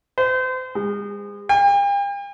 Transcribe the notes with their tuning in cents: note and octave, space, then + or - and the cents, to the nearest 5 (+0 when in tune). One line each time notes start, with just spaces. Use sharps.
C5 -35
G#3 -35
G5 +40